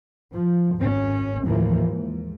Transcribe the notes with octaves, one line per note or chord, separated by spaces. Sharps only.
F3
G#1 C#4
D#2 A2 E3 F3 A#3
G#2